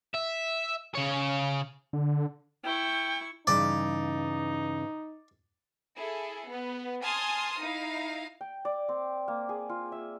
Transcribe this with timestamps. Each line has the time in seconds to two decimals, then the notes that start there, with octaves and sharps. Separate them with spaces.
0.14 E5
0.95 C#3 C#5
1.93 D3
2.64 E4 G5 C#6
3.47 G2 C#3 E3 D#4 D5
5.97 E4 G#4 A4
6.47 B3
7.03 G#5 A5 C6 D#6 F6
7.60 D#4 E4 F5
8.41 G5
8.65 D5
8.89 C4
9.28 A#3
9.49 G#4
9.69 F4
9.92 E5